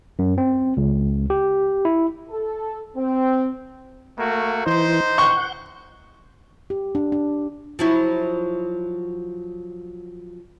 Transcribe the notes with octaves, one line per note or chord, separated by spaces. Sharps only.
F#2
C4
C#2
G4
E4
A4
C4
A3 A#3 F#4
E3 D#4 C5
F#5 C#6 G6
G4
D4
D4
F3 F#3 E4